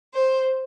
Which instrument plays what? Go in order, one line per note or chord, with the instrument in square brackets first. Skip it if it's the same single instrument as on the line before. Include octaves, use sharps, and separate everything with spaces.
[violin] C5